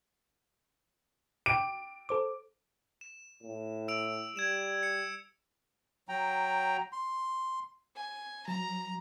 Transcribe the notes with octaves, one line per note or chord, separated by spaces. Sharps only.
G5 D6 D7
A4 C5 D6
E7
A2
E6 D7 F7
G3 G#6 E7 F7
C#7
F#3 G5 A#5
C6
G#5
F#3 A#5